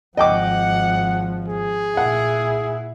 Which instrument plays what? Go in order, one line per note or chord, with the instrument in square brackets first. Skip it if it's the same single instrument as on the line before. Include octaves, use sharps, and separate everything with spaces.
[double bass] G#1 F3 [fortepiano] D#5 G5 D6 [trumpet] F#5
[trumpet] G#4
[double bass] A#2 E4 [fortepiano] F#5